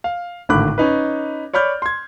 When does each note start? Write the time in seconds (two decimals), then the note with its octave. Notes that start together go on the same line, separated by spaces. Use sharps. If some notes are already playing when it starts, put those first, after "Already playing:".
0.04 F5
0.49 G#1 A2 D3 B5 D6 F#6
0.78 C#4 D#4 B4
1.54 C#5 D5 B5 F6 G6
1.82 C6 G#6